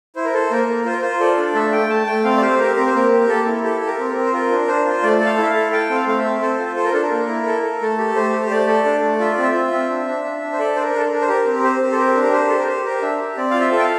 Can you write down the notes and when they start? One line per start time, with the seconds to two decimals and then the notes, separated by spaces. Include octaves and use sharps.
0.16 E4 C5
0.25 A#4
0.33 A4 C5
0.50 A#3 A#4
0.68 A#3
0.85 F4 C5
0.93 A#4
1.01 F4 C5
1.20 A4 D5
1.38 D4
1.55 A3 E5
1.72 A3 G5
1.90 A3 A5
2.07 A3 G5
2.24 C4 F5
2.37 D5
2.41 G4 C5
2.59 G4 A#4
2.76 C4 A#4
2.87 C5
2.94 A#3 A#4
3.12 G4
3.28 A#3 A4
3.46 E4
3.64 G4 A4
3.81 G4
3.87 A#4
3.99 C4
4.10 A#4
4.15 C4
4.25 C5
4.33 F4 A#4
4.51 D4
4.67 D4 C5
4.85 F4
5.03 A3 D5
5.21 A4 F5
5.38 E4 E5
5.50 A4 F5
5.72 A4 G5
5.89 C4
5.95 F5
6.07 A3 F5
6.18 E5
6.25 C4
6.42 A4 C5
6.59 F4
6.76 A4 C5
6.85 A#4
6.93 D4 A4
7.02 A#4
7.12 A#3
7.28 E4
7.46 A4
7.63 A4
7.81 A3 A4
7.98 G4
8.15 A3 C5
8.33 G4
8.51 A3 D5
8.68 A4
8.85 D4
9.02 A3
9.20 F4 E5
9.32 D5
9.38 C4
9.43 E5
9.54 F4
9.72 C4
9.90 D4
10.07 D4
10.24 D4
10.42 D4
10.52 C5
10.59 A4 D5
10.76 D4 C5
10.82 A#4
10.94 D4 A4
11.06 A#4
11.12 D4
11.22 C5
11.28 G4 A#4
11.46 C4
11.59 A#4
11.63 G4 C5
11.80 C4
11.92 A4
11.98 G4 A#4
12.15 D4
12.23 A#4
12.33 G4 C5
12.49 G4 A4
12.58 A#4
12.68 G4 C5
12.85 G4 A#4
13.02 D4 E5
13.20 G4
13.37 C4 D5
13.51 F4 F5
13.60 E5
13.72 A4
13.79 G5
13.84 F5